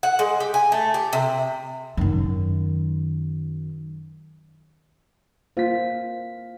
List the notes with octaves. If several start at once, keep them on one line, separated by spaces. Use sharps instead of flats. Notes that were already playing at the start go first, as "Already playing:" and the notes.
F#5
G#3
G4
G#5
A3
G4
C3
F#2 D#3
A#3 F4 C5 B6